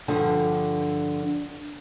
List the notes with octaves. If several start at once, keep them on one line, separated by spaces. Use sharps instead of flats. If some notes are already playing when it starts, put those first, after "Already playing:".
G2 D3 F3 F#5